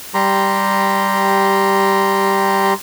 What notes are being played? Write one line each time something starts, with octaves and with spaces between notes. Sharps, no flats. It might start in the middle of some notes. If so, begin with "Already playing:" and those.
G3 G4 A#5 C6